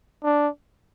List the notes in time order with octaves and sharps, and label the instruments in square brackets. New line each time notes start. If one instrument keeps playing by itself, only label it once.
[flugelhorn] D4